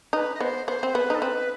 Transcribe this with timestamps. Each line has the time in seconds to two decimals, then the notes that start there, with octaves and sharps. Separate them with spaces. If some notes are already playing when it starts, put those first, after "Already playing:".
0.13 D#4 B4
0.34 D#5
0.40 B3 C5
0.67 B3 C5
0.83 C4
0.94 B3 B4
1.10 D#4 A4
1.22 C4 B4